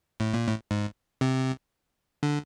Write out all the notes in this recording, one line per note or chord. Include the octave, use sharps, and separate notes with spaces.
A2
A#2
A2
G#2
C3
D3